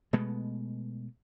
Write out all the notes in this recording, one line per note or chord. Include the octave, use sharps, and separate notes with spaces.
B2 G#3 A3 B3